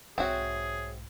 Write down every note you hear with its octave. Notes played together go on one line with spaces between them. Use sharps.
B1 G#2 C4 F#4 G#4 C#5 E5 F#5